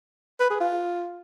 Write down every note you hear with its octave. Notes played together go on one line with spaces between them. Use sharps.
B4
G#4
F4